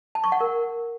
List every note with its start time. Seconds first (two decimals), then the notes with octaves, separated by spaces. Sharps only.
0.15 A5
0.24 C#6
0.32 F#5
0.41 A#4